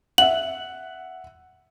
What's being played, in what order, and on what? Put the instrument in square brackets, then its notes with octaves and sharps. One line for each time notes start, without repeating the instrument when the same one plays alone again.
[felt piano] E5 F#5 [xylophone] F#7